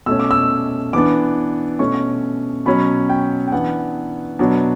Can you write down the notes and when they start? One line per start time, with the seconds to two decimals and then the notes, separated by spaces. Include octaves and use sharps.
0.06 B2 A3 C#4 E6
0.19 D6
0.31 E6
0.93 E3 B3 D4 D6
1.79 B2 A3 C#4 C#6
2.66 B2 F#3 C#4 B5
3.09 G5
3.47 G5
3.52 E3 B3 D4 F#5
4.39 B2 F#3 B3 D4